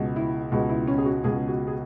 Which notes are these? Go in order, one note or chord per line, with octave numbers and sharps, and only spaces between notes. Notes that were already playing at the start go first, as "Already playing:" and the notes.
Already playing: C#2 B2 G#3
E4
C#2 B2 G#3
E4
C#4
G#4
F#4
C#2 B2 G#3 G#4
F#4
G#4